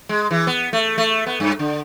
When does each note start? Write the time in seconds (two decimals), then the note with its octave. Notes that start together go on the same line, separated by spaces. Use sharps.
0.09 G#3
0.31 E3
0.47 B3
0.73 A3
0.98 A3
1.26 B3
1.40 G2
1.59 D3